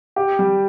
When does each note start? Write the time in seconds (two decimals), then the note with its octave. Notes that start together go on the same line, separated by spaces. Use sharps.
0.16 G4
0.39 G3